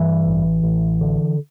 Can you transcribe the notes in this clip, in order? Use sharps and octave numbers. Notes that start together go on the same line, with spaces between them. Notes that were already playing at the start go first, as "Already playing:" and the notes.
Already playing: G2 E3
A1
A1
D3